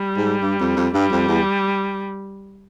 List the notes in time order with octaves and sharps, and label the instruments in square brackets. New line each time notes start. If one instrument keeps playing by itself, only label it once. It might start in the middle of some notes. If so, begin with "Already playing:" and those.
Already playing: [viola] G3
[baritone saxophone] G#2
G2
F2
F2
[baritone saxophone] G2 [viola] G3
[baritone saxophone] F2
E2